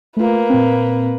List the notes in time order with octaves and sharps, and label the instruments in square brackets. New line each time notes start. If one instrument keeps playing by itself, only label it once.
[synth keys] A3 F4 [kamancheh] A#3 B4
[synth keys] A#2 C4